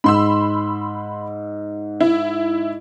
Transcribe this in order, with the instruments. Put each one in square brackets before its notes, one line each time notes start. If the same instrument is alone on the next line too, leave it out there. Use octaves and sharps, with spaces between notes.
[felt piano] G#2 [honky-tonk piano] B5 C6 E6
[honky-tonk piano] E4